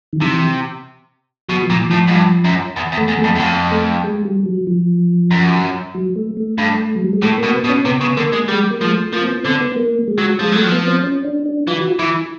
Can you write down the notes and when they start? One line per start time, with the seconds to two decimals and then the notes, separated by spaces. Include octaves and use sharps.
0.13 D#3
0.21 C3 E3
1.49 B2 F#3
1.63 F3
1.70 A#2
1.76 E3
1.90 A2 F3
2.08 G#2
2.12 G2
2.45 F#2
2.76 E2
2.92 E2
2.97 A3
3.08 E2
3.19 A3
3.24 F2
3.35 E2
3.39 F2
3.72 A3
4.04 G#3
4.25 G3
4.46 F#3
4.67 F3
5.31 F#2
5.95 F#3
6.16 A3
6.37 A3
6.58 G2
6.95 F#3
7.04 G3
7.13 G#3
7.22 A2 A3
7.38 A#3
7.43 B2
7.54 B3
7.64 B2
7.69 C#4
7.85 C3 B3
8.01 C#3
8.17 D3 A#3
8.33 G#3
8.48 G3 G#3
8.71 A#3
8.81 F3 G#3
8.92 A3
9.12 F3 A#3
9.21 C4
9.28 B3
9.44 D3 C4
9.61 B3
9.76 A#3
10.08 G#3
10.18 F#3
10.40 F3 G#3
10.52 F#3 A3
10.65 F3
10.72 B3
10.88 C4
11.04 C#4
11.25 D4
11.46 D4
11.67 E3 F4
11.77 F#4
11.87 F4
11.99 E3 E4